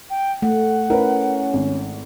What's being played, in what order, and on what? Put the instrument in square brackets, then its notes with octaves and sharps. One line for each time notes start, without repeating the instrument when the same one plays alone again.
[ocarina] G5
[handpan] A3 [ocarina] F#5
[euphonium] C#4 [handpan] E4 [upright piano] A#4 B4
[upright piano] G#1